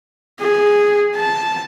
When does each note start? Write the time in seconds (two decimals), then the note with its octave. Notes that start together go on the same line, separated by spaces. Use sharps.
0.41 G#4
1.16 A5